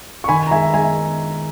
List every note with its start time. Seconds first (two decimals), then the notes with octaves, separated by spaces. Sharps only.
0.24 C#6
0.28 D#3 G#5 B5
0.47 A#5
0.51 G#3 E5 G#5
0.73 G#3 E5 G#5